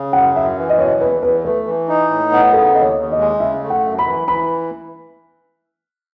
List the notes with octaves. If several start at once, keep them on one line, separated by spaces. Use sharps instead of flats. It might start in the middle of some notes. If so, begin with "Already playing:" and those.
Already playing: C#3
F#2 F#5
F#2 E5
E3
D#5
B2 C#5
E2 B4
E2 B4
A3 B4
E3
D#4
A2
B3
C#3 A4
D#2 D#5
C#5
D#2
D#5
G#3
C#3 E5
A3
F#5
F#2
B5
E3
E3 B5